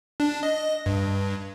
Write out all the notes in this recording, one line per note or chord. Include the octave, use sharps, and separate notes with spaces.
D4
D#5
G2